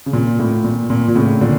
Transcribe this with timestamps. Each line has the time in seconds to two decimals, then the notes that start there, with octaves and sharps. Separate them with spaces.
0.06 C#3
0.13 A#2
0.39 A2
0.64 A#2
0.90 A#2
1.08 A#2
1.16 A2 C#3
1.41 A#2 D3